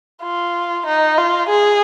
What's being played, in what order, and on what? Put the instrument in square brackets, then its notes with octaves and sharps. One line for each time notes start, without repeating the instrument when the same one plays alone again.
[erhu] F4
D#4
F4
G#4